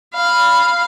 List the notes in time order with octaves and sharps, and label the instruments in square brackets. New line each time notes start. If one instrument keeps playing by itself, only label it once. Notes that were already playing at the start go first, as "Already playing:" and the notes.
[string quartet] F5 [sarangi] B5